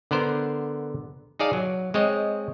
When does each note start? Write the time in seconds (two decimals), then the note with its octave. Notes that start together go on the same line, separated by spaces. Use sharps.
0.11 D3 B3 A#4 C5
1.39 D#4 G#4 D5 F5 A5
1.53 F#3
1.94 G#3 C4 C#5 D#5